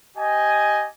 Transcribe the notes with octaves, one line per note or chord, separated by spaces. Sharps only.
G4 D#5 G#5